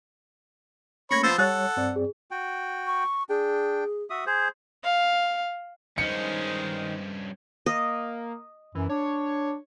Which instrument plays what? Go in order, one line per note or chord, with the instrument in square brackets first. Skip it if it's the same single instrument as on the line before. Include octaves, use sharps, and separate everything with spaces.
[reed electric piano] A3 A#3 C#4 [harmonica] C#5 B5 [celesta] G#6 A#6 C#7
[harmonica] F3 B3 C5 [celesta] E6 A6
[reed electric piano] G3 C#5 [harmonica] A4 F#5 [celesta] F#6 A6
[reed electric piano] G2 C4 D5
[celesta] G#4
[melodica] F#4 G5
[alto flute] C#6
[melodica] D4 G5 [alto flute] G#4
[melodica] F#4 E5 D#6
G#4 C5
[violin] F5
[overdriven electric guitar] G2 C#4 [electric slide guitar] D#3 [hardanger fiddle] G#3 C5 [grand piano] C#7
[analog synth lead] A#3 [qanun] D#5
[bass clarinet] F#2 [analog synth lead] E3
[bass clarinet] D4 [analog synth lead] C#5